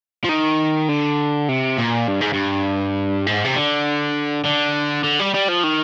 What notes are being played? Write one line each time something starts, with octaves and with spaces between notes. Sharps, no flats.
F3
D#3
D3
C3
A#2
G2
G#2
G2
G#2
C3
D3
D3
D3
G3
G3
F3
D#3